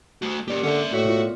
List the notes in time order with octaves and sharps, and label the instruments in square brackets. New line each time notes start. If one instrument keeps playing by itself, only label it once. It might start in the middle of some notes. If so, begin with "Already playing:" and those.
[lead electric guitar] A3 F#4
[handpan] A#3 D5 [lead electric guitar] C#4 G4
[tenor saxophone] D3 [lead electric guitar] C#4 E5
[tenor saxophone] A2 [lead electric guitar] F#4
[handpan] B2 F4